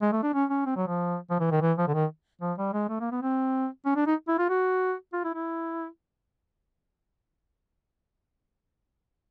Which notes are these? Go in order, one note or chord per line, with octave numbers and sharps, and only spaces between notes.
G#3
A3
D4
C#4
C#4
C4
F#3
F3
F3
E3
D#3
E3
F3
D3
D#3
F3
G3
G#3
A3
A#3
B3
C4
C#4
D4
D#4
E4
F4
F#4
F4
E4
E4